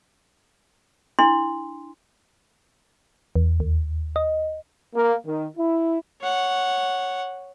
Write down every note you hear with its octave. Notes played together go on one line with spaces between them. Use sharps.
D4 E4 C6
E2
D#2
D#5
A#3
D#3
E4
C#5 F#5